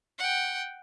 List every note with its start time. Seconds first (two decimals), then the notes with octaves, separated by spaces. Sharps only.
0.19 F#5 G5